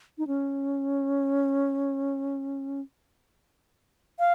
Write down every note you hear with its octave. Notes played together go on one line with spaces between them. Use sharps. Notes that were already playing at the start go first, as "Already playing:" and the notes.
D#4
C#4
F5